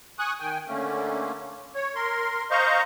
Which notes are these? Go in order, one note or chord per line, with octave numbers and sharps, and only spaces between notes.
G#5 C#6 D#6 F#6
D#3 G5 G#5
D3 A3 A#3 C#4
C#5
A#4 C6
C5 D#5 F5 A#5 C#6